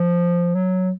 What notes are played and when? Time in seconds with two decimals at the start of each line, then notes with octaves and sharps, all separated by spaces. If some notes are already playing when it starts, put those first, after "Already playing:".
Already playing: F3
0.55 F#3